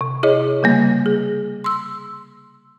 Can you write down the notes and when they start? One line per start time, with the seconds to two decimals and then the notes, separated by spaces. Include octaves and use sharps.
0.01 C3
0.23 E4 G#4 C#5 D#5
0.63 C#3 G3 A#3
1.06 G#4
1.64 C6 E6